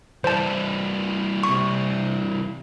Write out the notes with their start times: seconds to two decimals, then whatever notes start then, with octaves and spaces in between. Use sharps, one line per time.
0.24 E3 G3 C5 A5
1.44 C3 C#6